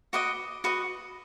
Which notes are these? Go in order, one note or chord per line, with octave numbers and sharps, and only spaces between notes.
F#4 B4 D#5 D6
F#4 B4 D#5